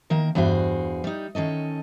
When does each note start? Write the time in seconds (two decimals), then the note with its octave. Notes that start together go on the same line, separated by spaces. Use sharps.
0.10 D#3 A#3 A#4
0.35 E2 G2 F#4 G#4 C5
1.04 G3 D#4
1.35 D#3 C#4 A4 D#5